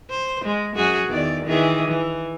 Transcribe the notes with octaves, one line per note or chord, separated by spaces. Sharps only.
C5
G#3
F#2 F#4 G#4
E2 D#3 D5
D#3 E3 G#4
E3